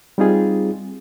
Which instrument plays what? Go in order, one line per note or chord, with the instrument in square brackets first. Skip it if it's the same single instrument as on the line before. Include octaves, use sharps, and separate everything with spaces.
[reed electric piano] G3 C4 D#4 F4 G#4